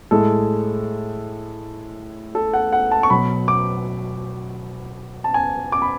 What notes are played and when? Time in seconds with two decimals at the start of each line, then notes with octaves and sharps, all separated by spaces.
0.11 A2 G#3 A4
2.35 A4
2.53 F#5
2.72 F#5
2.91 A5
3.03 C#6
3.10 B2 F#3 B5
3.48 D6
5.24 A5
5.34 G#5
5.72 D6
5.82 B5